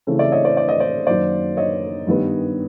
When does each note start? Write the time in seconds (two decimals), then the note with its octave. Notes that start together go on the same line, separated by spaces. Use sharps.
0.07 C#3 E3 A3 C4
0.19 D5 E5
0.32 C#5 D#5
0.45 C5 D5
0.57 D5
0.69 D#5
0.80 C5 D5
1.07 F#2 D#3 F#3 A#3 C5 D5
1.57 C#5 D#5
2.07 G2 D#3 G3 B3